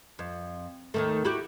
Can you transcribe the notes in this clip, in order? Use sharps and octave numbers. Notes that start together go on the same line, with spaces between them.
F2
D#2 D#3 A3
E4 F#4 G4